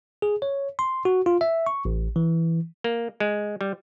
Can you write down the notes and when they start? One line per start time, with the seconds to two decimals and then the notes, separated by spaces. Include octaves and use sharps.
0.22 G#4
0.42 C#5
0.79 C6
1.05 F#4
1.26 F4
1.41 E5
1.66 C#6
1.85 A1
2.16 E3
2.84 A#3
3.20 G#3
3.61 G3